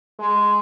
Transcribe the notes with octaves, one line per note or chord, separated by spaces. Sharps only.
G#3